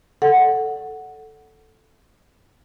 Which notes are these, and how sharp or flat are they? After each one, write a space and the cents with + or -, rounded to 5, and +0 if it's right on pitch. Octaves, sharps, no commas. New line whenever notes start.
A4 +0 D5 +0 F#5 +0